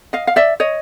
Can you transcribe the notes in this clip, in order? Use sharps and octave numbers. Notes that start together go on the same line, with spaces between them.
D#5 F5
F5
D5 E5
C#5 D#5